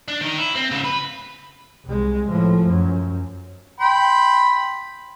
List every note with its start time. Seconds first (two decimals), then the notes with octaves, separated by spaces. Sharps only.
0.08 D4
0.21 D#3 D#4
0.38 E4
0.56 C4
0.71 G#2 C#3
0.84 B4
1.85 C2 G#3
2.29 A2 F3
2.67 F#2
3.80 G5 B5 C6